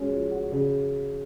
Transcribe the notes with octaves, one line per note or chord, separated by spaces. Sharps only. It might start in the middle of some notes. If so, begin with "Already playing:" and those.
Already playing: G#3 C#4 F#4
F3
F#4
C#3